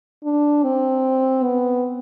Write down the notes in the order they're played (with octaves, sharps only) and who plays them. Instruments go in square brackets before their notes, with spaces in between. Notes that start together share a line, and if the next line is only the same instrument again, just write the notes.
[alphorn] D4
C4
B3